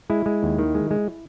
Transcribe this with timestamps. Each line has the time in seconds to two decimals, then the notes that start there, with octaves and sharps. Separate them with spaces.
0.10 G#3 E4
0.26 G#3
0.43 D#2
0.58 D#3
0.75 G#3
0.91 G#3